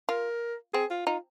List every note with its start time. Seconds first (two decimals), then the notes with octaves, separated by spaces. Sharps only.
0.09 F4 A#4
0.74 C4 G#4
0.90 F4
1.07 D#4 F4